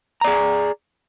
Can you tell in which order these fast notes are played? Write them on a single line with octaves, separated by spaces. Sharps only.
A#5 D5 G#4